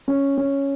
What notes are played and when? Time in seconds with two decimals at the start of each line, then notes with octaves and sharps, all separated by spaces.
0.08 C#4
0.38 C#4